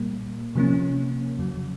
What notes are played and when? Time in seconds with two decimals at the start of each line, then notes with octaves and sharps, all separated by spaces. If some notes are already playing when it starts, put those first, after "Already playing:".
Already playing: A#2 G3 A#3
0.55 C3 F3 A#3 C#4
1.38 F2 C#3 F#3